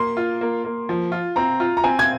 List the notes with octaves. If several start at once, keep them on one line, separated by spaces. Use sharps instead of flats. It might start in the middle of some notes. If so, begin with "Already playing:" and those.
Already playing: A#3 C6
F4
A#3
A#3
F3
F4
C4 A#5
F4
A#5
C4 G#5
G#6